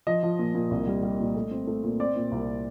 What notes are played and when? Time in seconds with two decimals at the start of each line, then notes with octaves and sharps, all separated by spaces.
0.07 F3 D#5
0.23 F3
0.39 A#2
0.55 A#2
0.71 C2
0.87 G3
1.03 G3
1.20 A#2
1.35 A3
1.51 C4
1.67 A3
1.84 A#2
2.00 C4 D5
2.16 A#2
2.32 C2